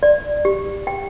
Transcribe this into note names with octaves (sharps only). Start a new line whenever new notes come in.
D5
G4
G5